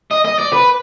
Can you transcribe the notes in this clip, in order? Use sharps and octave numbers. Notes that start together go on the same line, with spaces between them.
D#5
D#5
D5
B4